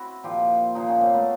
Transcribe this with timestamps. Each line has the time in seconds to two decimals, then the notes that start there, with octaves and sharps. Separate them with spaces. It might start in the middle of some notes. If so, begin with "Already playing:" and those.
Already playing: C4 E4 F#4
0.24 A#2 F3 F4 G4
0.75 A#2 F3 D#4 F4
0.88 C#4 D#4
1.01 A#3 C4
1.14 A3 B3